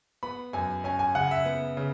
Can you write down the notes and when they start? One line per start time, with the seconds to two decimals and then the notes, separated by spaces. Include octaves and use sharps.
0.23 B3 B5
0.53 F#2 G#5
0.84 C#4 G#5
0.99 G#5
1.15 C#3 F#5
1.31 E5
1.45 B3
1.77 C#3